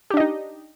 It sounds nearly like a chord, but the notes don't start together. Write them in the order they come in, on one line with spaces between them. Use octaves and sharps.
G4 D4 D#5 D#4